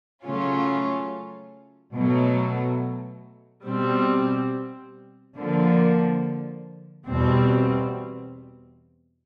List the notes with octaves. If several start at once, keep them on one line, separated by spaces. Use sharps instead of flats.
C#3 F#3 A3 C#4 F4
B2 F#3 A3
B2 G3 C4
D3 F3 A#3
E2 B2 G3 C4